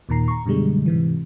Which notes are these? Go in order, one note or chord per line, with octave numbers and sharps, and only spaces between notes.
D#2 A#2 D#3 A#5 C7
A#5 C#6
F#2 B2 D3 G3 G#3
G#2 C3 E3